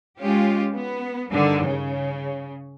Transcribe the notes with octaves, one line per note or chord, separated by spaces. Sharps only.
G#3 C#4 F4 G4
B3
G2 D3 D#3
C#3